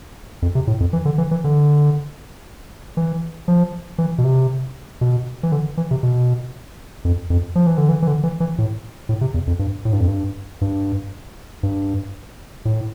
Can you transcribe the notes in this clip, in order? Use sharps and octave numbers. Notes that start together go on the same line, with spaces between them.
F2
C3
A2
F2
E3
D3
E3
E3
D3
E3
F3
E3
B2
C3
B2
E3
D3
E3
C3
B2
F2
F2
F3
E3
D3
E3
E3
D3
E3
E3
A2
A2
C3
E2
F2
G2
A2
G2
F2
G2
G2
G2
A2